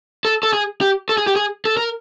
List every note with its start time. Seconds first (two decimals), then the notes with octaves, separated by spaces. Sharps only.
0.25 A4
0.43 A4
0.53 G#4
0.81 G4
1.09 A4
1.18 G#4
1.27 G4
1.36 G#4
1.65 A4
1.77 A#4